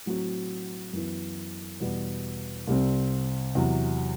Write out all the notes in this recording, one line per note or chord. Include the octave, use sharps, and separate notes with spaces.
A2 F#3 C4 F#4
F#2 E3 B3
E2 B2 G3 B3
C2 C3 G3 C4
E2 C3 F#3